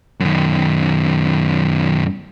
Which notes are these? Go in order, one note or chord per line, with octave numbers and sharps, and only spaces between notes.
F#2 D#3